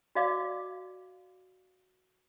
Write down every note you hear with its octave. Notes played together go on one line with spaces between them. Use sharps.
F#4 D5 D#5 F5 D6